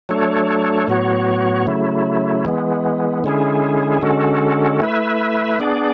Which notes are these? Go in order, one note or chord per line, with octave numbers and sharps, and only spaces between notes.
F#3 A3 D4 A4 C#5
A2 F#3 B3 F#4 C#5
C#3 F#3 A3 E4
E3 G#3 B3
D3 G#3 C#4 E4 G#4
D3 G#3 C#4 F#4 A4
A3 E4 B4 E5
B3 D4 G#4 D5